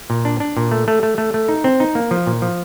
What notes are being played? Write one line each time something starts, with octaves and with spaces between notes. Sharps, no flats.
A#2
D4
D4
A#2
A3
A3
A3
A3
A3
D#4
C4
D#4
A#3
F3
A#2
F3